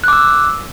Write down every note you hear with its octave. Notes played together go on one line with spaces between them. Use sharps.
D6 E6 F#6